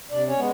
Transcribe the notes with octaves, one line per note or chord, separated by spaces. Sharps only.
C3 D4 D5
C#4 C#5
G#3 B3